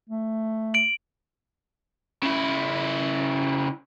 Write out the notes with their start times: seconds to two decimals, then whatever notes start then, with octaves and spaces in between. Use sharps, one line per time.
0.09 A3
0.74 D7 F#7
2.23 C#3 E4